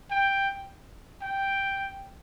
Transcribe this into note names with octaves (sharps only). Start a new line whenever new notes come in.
G5
G5